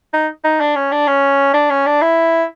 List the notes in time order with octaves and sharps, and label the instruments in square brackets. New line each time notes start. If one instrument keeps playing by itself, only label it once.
[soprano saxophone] D#4
D#4
D4
C#4
D4
C#4
D4
C#4
D4
E4